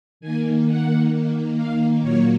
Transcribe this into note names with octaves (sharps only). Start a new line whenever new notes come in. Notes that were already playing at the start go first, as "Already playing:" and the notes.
D#3 A#3 G#5
F#5
D#3 A#3
F5
A#2 F#3 A#3 C#5